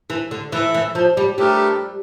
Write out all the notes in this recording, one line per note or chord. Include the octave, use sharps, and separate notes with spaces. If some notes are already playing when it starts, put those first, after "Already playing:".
E3
D3
E3 E4 A4 E5
E3
F3
G3
G3 A3 D4 G4 A#4